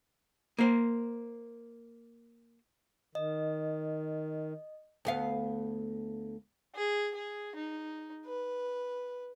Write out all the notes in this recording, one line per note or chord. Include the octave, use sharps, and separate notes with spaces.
A#3 C5
D#3 D#5
D2 B3 F5
G#4
G#4
D#4
B4